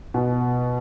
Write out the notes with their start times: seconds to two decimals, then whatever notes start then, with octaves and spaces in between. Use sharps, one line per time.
0.14 B2